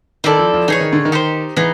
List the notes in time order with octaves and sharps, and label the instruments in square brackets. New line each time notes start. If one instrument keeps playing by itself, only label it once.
[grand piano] D#3 [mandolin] C4 E4 A4 D5
[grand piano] F3
F3
[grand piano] E3 [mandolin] D#4 G#4 C#5
[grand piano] D#3
D3
D#3
[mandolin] D#4 G4 C5
[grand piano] E3 [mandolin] B3 D#4 G#4